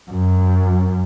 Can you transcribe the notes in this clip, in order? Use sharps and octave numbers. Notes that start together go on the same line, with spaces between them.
F#2